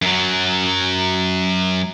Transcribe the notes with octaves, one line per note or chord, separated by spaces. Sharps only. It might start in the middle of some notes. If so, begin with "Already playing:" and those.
F#2 F#3